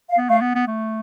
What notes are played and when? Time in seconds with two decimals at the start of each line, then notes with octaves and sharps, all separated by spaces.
0.09 F5
0.18 B3
0.29 A3 F5
0.41 B3
0.55 B3
0.67 A3